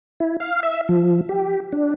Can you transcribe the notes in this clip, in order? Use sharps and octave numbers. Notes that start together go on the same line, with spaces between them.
E4
F5
E5
F3
G4
D4